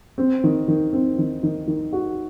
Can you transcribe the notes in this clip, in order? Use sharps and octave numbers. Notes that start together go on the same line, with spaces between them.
C4
D#3
D#3
C4
D#3
D#3
D#3
F#4